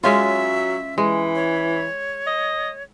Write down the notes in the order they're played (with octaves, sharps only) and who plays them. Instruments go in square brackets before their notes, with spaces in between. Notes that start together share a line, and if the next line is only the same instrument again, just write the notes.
[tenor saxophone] F#3 [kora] G#3 C#4 F4 [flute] E5
[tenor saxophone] E3 [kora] G#3
[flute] C#5
[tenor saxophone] D#5